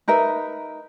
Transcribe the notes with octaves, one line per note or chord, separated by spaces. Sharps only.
D#4 A#4 B4 E5